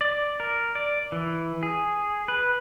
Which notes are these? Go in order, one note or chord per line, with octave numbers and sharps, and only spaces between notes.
D5
A#4
D5
E3
G#4
B4